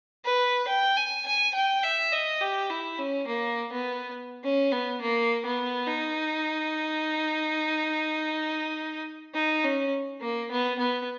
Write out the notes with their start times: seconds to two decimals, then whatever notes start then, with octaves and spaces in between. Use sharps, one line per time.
0.25 B4
0.68 G5
0.97 G#5
1.26 G#5
1.54 G5
1.83 E5
2.12 D#5
2.41 G4
2.70 E4
2.98 C#4
3.27 A#3
3.72 B3
4.44 C#4
4.72 B3
5.01 A#3
5.45 B3
5.87 D#4
9.34 D#4
9.64 C#4
10.21 A#3
10.51 B3
10.79 B3